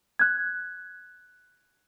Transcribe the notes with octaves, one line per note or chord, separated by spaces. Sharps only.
F#6 G#6